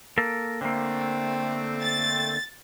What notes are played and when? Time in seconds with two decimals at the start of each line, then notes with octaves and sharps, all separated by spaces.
0.18 A#3 A4 A#4
0.61 D3 A3 A#3 C4
1.82 A6